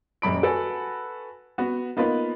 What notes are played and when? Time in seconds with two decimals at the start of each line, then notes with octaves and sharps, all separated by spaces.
0.22 D#1 F#2 B5 D7
0.43 F#4 A4 B4 G#5
1.58 B3 F#4
1.97 A#3 B3 D#4 F4 B4